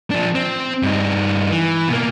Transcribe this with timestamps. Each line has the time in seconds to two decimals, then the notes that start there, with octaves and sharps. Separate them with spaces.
0.11 F3 D4
0.35 C4
0.83 G2 D#4
1.51 E3
1.89 B2 A#3